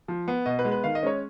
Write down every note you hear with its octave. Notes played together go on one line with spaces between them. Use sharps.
F3
B3
B2 D#5
B4
G#3 B3
B4
D#3 F5
D#5
G#3 C#4 C#5